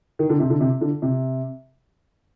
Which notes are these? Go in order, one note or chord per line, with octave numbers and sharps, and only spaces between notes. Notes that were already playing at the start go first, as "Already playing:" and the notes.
D#3
D3
C3
D3
C3
D3
C3